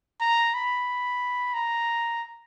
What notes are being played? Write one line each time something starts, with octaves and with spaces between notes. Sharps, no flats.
A#5
B5
A#5